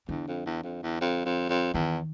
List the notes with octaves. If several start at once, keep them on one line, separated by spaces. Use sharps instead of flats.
E2 D3
F2
E2
F2
E2
F2
F2
F2
E2 D#3